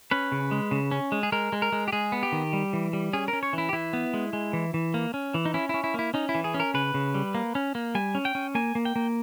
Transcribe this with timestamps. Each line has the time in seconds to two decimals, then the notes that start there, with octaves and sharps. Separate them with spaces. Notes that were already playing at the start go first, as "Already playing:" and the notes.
0.11 C#4 B4
0.32 C#3
0.51 G#3
0.71 C#3
0.91 C#4
1.12 G#3
1.23 G#4
1.32 G#3 A#4
1.53 G#3
1.62 A#4
1.72 G#3
1.88 G4
1.93 G#3 G#4
2.12 B3
2.23 G4
2.32 D#3
2.53 G3
2.73 E3
2.93 G3
3.13 C#4 G#4
3.28 A#4
3.33 C#4
3.43 C#5
3.53 E3 E4
3.69 G4
3.73 E3 E4
3.93 B3
4.14 G#3
4.33 G#3
4.53 E3
4.74 E3
4.94 A#3
5.14 C#4
5.34 E3
5.46 D#4
5.54 C#4 E4
5.69 C#4 E4
5.84 E4
5.94 A#3 E4
6.14 C#4 D#4
6.29 E4
6.35 E3
6.44 G#4
6.54 C#4
6.60 A#4
6.74 C#3 B4
6.94 C#3
7.14 G3
7.35 A#3
7.55 C#4
7.75 A#3
7.95 G3 G#5
8.15 C#4
8.25 G5
8.35 C#4
8.55 A#3 G#5
8.75 A#3
8.85 G5
8.96 A#3